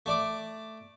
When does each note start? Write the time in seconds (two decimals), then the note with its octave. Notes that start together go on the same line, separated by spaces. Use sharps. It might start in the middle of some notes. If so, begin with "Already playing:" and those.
0.06 A3 D5 D6